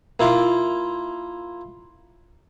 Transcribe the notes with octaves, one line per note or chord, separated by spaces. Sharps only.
A#3 E4 F4